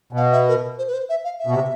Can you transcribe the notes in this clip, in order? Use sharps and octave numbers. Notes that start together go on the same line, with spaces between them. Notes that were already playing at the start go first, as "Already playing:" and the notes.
B2 F5
E5
A#4
C5
B4
C5
E5
F5
E5
B2
C3